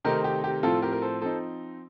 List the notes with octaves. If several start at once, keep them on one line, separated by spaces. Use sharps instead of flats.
C3 D#3 A3 C4 D#4 G4 A#4
G4
G4
A2 F3 C4 F4 A4
G4 A#4
A#4
A4 C5
F3 C4 D#4 A4 C5